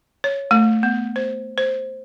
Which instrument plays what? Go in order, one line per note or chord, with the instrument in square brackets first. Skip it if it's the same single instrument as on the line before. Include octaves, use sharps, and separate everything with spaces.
[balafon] C#5
A3
B3
C5
C5